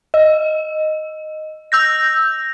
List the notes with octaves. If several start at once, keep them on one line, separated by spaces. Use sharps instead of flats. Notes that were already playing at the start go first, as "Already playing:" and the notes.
D#5
E6 G6 A#6